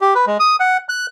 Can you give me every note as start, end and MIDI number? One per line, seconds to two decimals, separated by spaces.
0.01 0.14 67
0.15 0.25 71
0.27 0.37 56
0.40 0.56 87
0.60 0.77 78
0.89 1.06 90